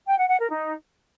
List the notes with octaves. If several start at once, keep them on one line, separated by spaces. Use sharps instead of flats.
G5
F#5
F#5
A#4
D#4